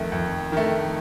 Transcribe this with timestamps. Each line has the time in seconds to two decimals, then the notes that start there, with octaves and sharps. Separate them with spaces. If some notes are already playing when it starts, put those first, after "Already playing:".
Already playing: F2 D#3 A3
0.12 F2
0.52 D#3 A3